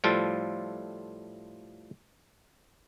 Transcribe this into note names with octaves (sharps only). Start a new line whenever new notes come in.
A2 F3 G3 F4 A4 A5